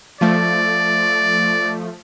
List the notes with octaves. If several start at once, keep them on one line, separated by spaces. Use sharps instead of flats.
F3 A3 D5